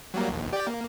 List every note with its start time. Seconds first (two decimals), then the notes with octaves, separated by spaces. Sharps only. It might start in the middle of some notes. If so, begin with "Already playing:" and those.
0.14 F#3 G3 A#3
0.29 A#1 D#2
0.53 G4 D5 G5
0.67 A#3